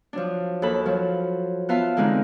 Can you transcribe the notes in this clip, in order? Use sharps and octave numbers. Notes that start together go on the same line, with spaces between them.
F3 F#3 D4
D#2 A4 B5
F3 F#3
B3 F4 E5 F5 A5
D3 E3 G#3 C4 D#4